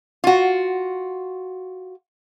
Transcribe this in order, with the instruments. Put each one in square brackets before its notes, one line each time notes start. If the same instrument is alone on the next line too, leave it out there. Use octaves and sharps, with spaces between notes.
[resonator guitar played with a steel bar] F4 F#4